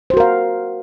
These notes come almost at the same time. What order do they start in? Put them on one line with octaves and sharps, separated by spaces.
C5 F#4 A#4 F5